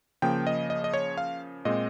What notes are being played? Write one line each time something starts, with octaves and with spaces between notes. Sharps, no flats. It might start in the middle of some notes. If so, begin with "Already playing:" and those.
C#3 F3 A#3 G5
D#5
D#5
D#5
C#5
F5
A#2 G#3 C4 D#5